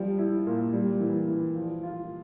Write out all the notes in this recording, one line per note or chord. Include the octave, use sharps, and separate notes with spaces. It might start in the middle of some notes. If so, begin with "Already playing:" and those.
Already playing: F3 G3
E4
A#2
G3
E3
E3
F3
F4